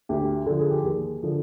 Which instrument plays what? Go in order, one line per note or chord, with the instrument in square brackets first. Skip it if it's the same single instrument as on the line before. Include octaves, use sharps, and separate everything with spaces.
[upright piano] D2 G4
D3 F3 A4
G#4
G4
D#2 G#4
D3 F3